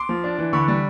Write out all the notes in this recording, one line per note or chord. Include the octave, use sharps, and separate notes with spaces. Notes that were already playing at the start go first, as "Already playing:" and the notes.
Already playing: C6 D6
F3
D4
E3
D3 B5 C#6
G3